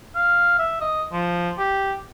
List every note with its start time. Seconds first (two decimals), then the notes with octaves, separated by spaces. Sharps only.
0.15 F5
0.59 E5
0.81 D#5
1.12 F3
1.58 G4